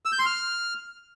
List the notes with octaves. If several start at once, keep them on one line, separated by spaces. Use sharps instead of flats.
E6
G6
C6
F6